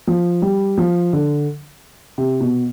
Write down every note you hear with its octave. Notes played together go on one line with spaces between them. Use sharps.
F3
G3
F3
D3
C3
B2